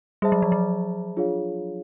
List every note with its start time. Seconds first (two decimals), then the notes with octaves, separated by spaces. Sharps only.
0.22 G3 G#4 C5 E5 A5
0.32 F#3
0.42 F3
0.52 F#3
1.17 D4 F4 G#4 C#5 F5